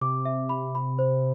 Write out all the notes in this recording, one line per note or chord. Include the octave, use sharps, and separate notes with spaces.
C3 D6
E5
B5
B5
C5